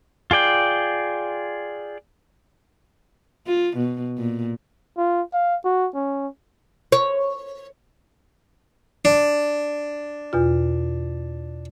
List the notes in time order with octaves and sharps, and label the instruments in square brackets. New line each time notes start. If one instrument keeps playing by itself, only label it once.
[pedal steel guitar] F4 G#4 D5 G5
[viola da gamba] F4
B2
A#2
[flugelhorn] F4
F5
F#4
C#4
[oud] C#5
[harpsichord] D4
[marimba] E2 B2 F4